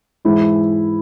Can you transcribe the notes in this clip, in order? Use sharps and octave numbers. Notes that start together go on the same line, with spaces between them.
G#2 E3 G#3 E4